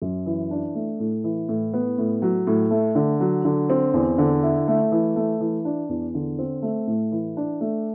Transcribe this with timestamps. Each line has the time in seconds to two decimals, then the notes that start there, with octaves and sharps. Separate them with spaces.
0.02 F#2
0.26 E3
0.51 D4
0.75 A3
1.00 A2
1.24 E3
1.49 A2
1.74 B3
1.98 A2
2.22 F#3
2.47 A2
2.71 A3
2.95 D3
3.20 F#3
3.45 D3
3.70 C4
3.94 E2
4.18 D3
4.43 E4
4.68 A3
4.92 E3
5.16 A3
5.41 E3
5.65 D4
5.89 E2
6.14 D3
6.39 C4
6.62 A3
6.87 A2
7.12 E3
7.37 D4
7.61 A3